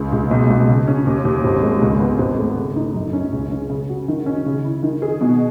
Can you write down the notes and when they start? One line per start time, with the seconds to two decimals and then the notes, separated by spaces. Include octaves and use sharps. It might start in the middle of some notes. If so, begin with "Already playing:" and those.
Already playing: C#2
0.12 C#2
0.31 B1
0.50 B1
0.68 C#3
0.87 C#4
1.07 D#2
1.25 D#2
1.44 G#1
1.63 G#3
1.81 C#2
2.00 B3
2.19 G#1
2.38 A3
2.57 C#3
2.76 D#4
2.94 F#2
3.13 C#4
3.32 C#2
3.51 C#4
3.70 C#3
3.89 F#4
4.08 D#3
4.26 C#4
4.46 C#3
4.64 E4
4.83 D#3
5.02 G#4
5.21 B2